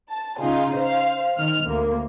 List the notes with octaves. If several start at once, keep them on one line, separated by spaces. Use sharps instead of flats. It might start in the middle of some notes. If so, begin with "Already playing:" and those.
A5
C#3 D#4 F4 G#4
C5 F5
D#3 F6
D2 A#3